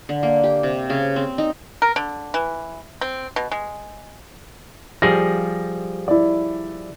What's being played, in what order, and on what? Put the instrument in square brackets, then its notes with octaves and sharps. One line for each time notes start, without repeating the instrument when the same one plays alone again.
[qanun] D3
A#3
G4
C3
C#3
C4
D#4
[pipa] A#4
D3
E3
C4
B2
G#3
[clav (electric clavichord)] F3 G3 G#4 [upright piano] A#6
[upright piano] E4 D5